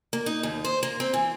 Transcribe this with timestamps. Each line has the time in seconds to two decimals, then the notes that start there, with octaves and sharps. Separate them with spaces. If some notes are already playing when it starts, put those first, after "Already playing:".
0.13 A#3
0.26 D#4
0.43 D#2
0.64 C5
0.83 A#3
1.00 C4
1.13 E3